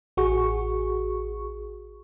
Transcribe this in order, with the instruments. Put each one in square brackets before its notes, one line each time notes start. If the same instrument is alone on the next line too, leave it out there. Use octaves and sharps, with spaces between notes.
[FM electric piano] A1 F#4 G#4 C#6